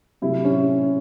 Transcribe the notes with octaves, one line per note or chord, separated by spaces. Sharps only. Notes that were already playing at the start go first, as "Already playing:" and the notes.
C3 F#3 A3 E4
C#4